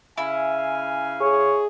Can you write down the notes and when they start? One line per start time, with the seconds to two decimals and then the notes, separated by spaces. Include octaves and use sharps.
0.18 C#3 E4 F5 G#5
1.21 G#4 C#5